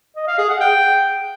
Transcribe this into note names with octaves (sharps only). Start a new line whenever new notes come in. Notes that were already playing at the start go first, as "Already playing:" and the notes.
D#5
F5
G#4
F#5
G5